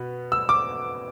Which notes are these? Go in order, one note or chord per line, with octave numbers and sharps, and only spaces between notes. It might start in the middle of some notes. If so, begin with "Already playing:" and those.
Already playing: B2 B3
E6
D6